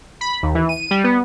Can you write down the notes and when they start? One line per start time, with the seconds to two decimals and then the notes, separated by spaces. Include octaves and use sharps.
0.21 B5
0.43 D#2
0.55 E3
0.69 D#7
0.91 G3
1.04 B3